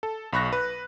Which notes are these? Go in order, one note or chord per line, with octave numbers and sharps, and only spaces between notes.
A4
B1 B5 C#6 F#6 A#6
B4